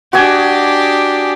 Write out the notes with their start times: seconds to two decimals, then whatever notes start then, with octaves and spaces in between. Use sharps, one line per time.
0.13 D4 F#4 G4 D#5 G#5